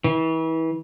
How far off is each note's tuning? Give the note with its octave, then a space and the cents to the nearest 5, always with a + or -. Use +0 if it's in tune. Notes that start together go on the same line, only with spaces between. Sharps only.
E3 -30